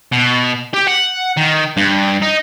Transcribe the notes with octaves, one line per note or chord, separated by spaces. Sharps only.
B2
G4
F#5
D#3
G2
D#4